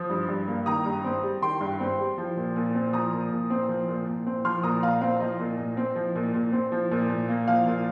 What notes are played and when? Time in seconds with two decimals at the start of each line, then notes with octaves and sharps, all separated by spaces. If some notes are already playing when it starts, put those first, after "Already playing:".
Already playing: F3 D#6
0.10 G2
0.29 G2
0.48 A#3
0.66 D#3 A#5 D#6
0.85 G2
1.04 C4
1.23 G3
1.42 D#3 G5 C6
1.61 G2
1.80 C4
1.99 G3
2.18 F3
2.37 A#2
2.56 A#2
2.75 C4
2.93 F3 A#5 D#6
3.13 A#2
3.31 A#2
3.50 C4
3.69 F3
3.88 A#2
4.07 A#2
4.27 C4
4.45 F3 C6 F6
4.63 A#2 A#5 D#6
4.82 A#2 F5 A#5
5.01 C4 F5
5.20 F3 D#5
5.40 A#2
5.58 A#2
5.77 C4
5.96 F3
6.15 A#2
6.34 A#2
6.52 C4
6.72 F3
6.91 A#2
7.10 A#2
7.29 A#3
7.48 F3 F5
7.67 A#2